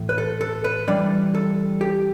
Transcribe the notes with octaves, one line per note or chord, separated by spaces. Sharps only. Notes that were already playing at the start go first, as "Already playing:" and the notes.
Already playing: A2 E3 A3
B4
A4
A4
B4
E3 G3 D4 D5
A4
G4